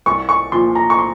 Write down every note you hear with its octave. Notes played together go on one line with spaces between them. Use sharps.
C2 C#6
C#6
A#2 F3 C6
A#5
C#6
C6